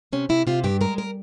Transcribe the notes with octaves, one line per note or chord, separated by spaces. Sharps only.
C3 C#4
C3 E4
C3 F4
G2 G4
G#3 A#4
A#4